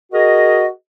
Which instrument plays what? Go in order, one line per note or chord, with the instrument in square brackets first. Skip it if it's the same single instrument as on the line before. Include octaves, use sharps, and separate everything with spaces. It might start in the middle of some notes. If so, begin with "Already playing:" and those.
[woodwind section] F#4 G#4 A#4 D#5